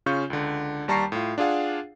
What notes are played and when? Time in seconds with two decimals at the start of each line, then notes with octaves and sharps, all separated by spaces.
0.06 C#3 C#4 F4 C#6 G6
0.30 C#2 D3
0.88 D#2 G3 A5 A#5 C#6 C7
1.12 A2 F4
1.38 D4 F4 G#4 F5 F#5